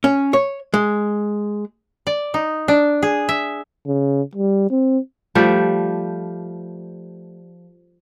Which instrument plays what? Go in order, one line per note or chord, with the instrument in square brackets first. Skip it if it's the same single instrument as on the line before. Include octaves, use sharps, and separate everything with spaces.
[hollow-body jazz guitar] C#4
C#5
G#3
[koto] D5
D#4
D4
G#4
E5
[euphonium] C#3
G3
C4
[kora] F3 G3 A3 D5